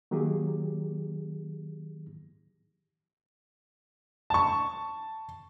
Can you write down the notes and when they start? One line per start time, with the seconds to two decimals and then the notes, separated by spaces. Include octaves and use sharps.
0.11 D#3 F#3 A#3 G4 G#4
4.30 A5 C#6